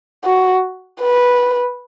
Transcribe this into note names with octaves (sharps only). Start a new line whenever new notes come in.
F#4
B4